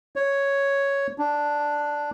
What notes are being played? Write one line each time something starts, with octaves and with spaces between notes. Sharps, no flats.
C#5
D4